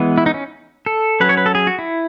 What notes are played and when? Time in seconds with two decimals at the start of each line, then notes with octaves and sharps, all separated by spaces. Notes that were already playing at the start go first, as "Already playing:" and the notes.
Already playing: E3 G#3 B3
0.18 E4
0.26 D#4
0.34 C#4
0.86 A4
1.20 F#3 C#4 B4
1.29 C#5
1.37 B4
1.46 A4
1.55 G#4
1.67 F#4
1.79 E4